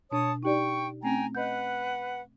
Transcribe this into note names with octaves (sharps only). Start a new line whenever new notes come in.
B2 D4 C#5 A5 D#6
D#4 G4 D5 G5 C#6
A3 C4 C#4 G5 G#5 A#5
B4 D#5 F#5 G6